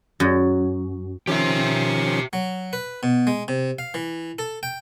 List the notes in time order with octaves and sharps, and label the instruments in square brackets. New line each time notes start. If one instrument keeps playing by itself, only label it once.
[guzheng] F#2
[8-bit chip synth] D#3 F3 C#4 [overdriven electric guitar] G4 E5
[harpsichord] F#3
B4
B2
G#3
C3
F5
E3
A4
G5